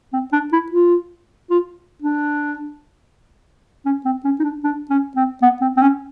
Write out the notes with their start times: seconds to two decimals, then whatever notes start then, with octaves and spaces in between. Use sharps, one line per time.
0.13 C4
0.32 D4
0.52 E4
0.72 F4
1.50 F4
2.02 D4
3.86 C#4
4.05 C4
4.25 C#4
4.40 D#4
4.44 D4
4.64 D4
4.90 C#4
5.16 C4
5.42 B3
5.61 C4
5.77 C4
5.82 C#4